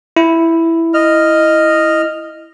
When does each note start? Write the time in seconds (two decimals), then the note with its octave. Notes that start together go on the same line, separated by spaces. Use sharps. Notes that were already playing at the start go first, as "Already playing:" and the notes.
0.17 E4
0.94 D#5 F6